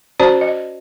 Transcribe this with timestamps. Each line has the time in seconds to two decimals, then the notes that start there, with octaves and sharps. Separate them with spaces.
0.20 C#4 F#4 C5 D5 A5
0.41 D#5